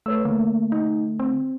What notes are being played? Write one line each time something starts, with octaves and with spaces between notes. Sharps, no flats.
A3 B4 C#5 E6
D3 A3 A#3
D#4
C4